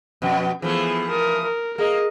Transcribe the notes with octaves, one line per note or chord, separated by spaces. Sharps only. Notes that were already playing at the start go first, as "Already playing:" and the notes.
F2 B2
E3 F3 A3 B3 G#4
A#4 D#6
A#4
A#3 G#4 A#4 D#5